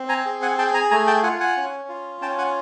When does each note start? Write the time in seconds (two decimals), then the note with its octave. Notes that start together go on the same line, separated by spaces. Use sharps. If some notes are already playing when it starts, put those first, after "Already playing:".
Already playing: C4
0.09 G#5 A#5
0.26 G#4
0.42 F#5 G#5
0.58 G#4 G5 A5
0.74 G#5 A#5
0.91 A3 G#5 A#5
1.07 G5 A5
1.23 F4 F#5 G#5
1.40 F#5 G#5
1.57 C#4
1.89 F4
2.21 C#4 G5 A5
2.38 F#5 G#5